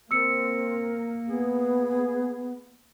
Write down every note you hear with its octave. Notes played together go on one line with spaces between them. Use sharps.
A#3 C4 A#4 E6 C#7
B3 G#4